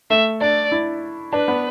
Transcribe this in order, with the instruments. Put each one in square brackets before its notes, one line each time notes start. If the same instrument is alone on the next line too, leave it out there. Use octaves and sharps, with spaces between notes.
[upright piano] A3 [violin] E5
[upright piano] D4 [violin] D5
[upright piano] E4
[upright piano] D4 [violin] B4
[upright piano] B3